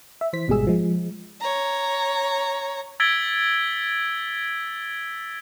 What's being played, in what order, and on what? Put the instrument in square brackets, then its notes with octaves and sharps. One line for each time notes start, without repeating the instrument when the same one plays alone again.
[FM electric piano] E5
E3 C5 B6
G#1 B2 G3 G#3 G#4 E6
F3 G#3
[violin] C#5 A#5
[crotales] E6 G#6 A6 B6 D7 G7